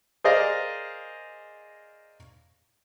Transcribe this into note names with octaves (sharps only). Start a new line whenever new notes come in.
G#4 A#4 C5 D5 D#5 F5